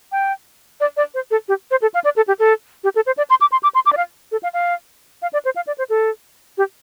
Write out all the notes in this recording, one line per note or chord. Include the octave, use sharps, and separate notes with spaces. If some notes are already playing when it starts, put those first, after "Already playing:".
G5
D5
D5
C5
A4
G4
C5
A4
F5
D5
A4
G4
A4
G4
A4
C5
D5
C6
D6
C6
D6
C6
D6
D5
F5
A4
F5
F5
F5
D5
C5
F5
D5
C5
A4
G4